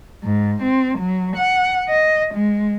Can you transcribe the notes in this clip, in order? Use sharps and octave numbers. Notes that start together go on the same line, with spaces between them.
G#2
C4
F#3
F#5
D#5
G#3